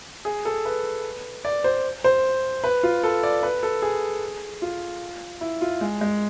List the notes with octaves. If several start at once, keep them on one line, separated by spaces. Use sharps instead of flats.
G#4
A4
B4
D5
C5
C5
B4
F4
A4
D5
B4
A4
G#4
F4
E4
F4
G#3
G#3